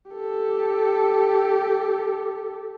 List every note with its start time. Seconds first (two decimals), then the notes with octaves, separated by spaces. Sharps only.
0.12 G4 A4